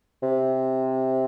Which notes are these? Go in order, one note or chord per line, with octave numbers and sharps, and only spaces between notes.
C3